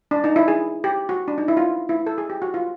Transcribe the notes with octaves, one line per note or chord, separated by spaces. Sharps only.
D4
D#4
E4
G#4
G4
F#4
D4
D#4
E4
F4
E4
A4
G#4
G4
F#4
F4